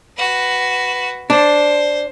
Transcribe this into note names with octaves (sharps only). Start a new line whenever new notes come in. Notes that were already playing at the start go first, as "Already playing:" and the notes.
F#4 B4
D4 C5